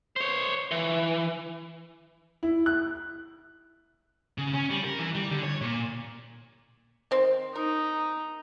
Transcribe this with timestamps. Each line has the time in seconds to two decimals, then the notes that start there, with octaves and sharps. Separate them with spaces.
0.16 C5 C#5
0.71 E3
2.43 E4
2.66 F#6
4.38 C#3
4.54 C#4
4.71 G3
4.84 A#4
4.99 E3
5.15 G3
5.31 D3
5.43 C#5
5.61 A#2
7.11 D#3 C4
7.55 D#4 A#4